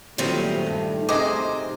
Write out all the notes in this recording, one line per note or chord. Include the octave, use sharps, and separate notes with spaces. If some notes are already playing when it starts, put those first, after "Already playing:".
A#2 D#3 F#3 G3 A3 C4 D#4
G2
C3 D#4 G4 G#4 C5 D#5 G#5